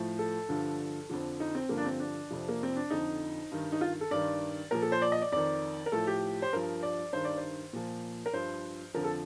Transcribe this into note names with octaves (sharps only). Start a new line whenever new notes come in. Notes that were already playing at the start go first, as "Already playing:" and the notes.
Already playing: A2 F3
A4
G2 D3 F3
F2 D3 F3
D#4
C4
G2 D3 F3 A#3
D4
C4
D4
F2 C3 F3
A#3
C4
D4
F2 D3 F3 D#4
G2 D#3
D#4
F4
A4
G2 D#3 D5
A#2 F3 A#4
A4
C5
D5
D#5
D5
F2 D#3 D5
A#4
A2 F3 A4
G4
C5
G2 F3 A#4
D5
G2 D#3 C5
D5
C5
A#2 F3
A#4
G2 F3 C5
F2 D3 F3 A#4
A4